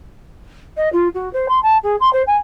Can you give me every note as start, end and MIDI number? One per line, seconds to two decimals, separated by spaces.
0.77 0.91 75
0.92 1.08 65
1.14 1.31 66
1.33 1.46 72
1.48 1.61 84
1.63 1.77 81
1.83 1.96 68
2.00 2.11 84
2.13 2.22 72
2.27 2.37 80